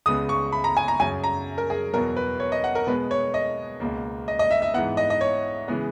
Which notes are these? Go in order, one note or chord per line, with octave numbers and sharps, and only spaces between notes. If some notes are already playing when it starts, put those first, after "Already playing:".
C#2 C#3 G#3 B3 D#6
C#6
B5
A#5
G#5
A#5
F#2 C#3 F#3 G#5
A#5
A#4
G#4
E2 B2 F#3 B3 A#4
B4
C#5
D#5
F#5
A#4
B2 G#3 B3 B4
C#5
D#5
C#2 B2 A#3
D#5
D#5
E5
E5
G#2 E3 B3 F#5
D#5
D#5
C#5
C#3 E3 G#3 B3